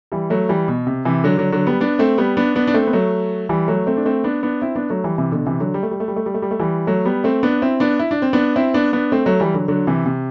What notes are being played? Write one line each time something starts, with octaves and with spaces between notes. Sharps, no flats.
E3 G3
F#3 A3
E3 G3
B2
C3
C3 E3
D3 F#3
D3 F#3
D3 F#3
G3 B3
B3 D4
A3 C4
G3 B3
B3 D4
B3 D4
D4
A3 C4
B3
F#3 A3
E3 G3
F#3 A3
A3 C4
D4
A3 C4
B3 D4
B3 D4
C4 E4
B3 D4
F#3 A3
E3 G3
C3 E3
B2 D3
C3 E3
D3 F#3
G3
A3
G3
A3
G3
A3
G3
A3
G3
A3
E3 G3
F#3 A3
G3 B3
A3 C4
B3 D4
C4 E4
B3 D4
E4
D4
C4
B3 D4
C4 E4
B3 D4
B3 D4
A3 C4
F#3 A3
E3 G3
D3 F#3
D3 F#3
C3 E3
C3